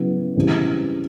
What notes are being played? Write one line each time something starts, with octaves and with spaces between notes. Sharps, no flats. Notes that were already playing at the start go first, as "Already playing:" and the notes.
Already playing: C#3 F#3 B3 E4
C#3 E3 G3 C4